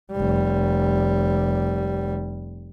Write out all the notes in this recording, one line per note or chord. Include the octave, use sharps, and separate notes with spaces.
F1 G3